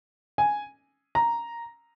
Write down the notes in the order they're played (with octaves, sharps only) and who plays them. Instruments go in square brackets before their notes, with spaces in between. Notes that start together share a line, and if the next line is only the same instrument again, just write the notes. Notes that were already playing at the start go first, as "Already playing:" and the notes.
[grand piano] G#5
A#5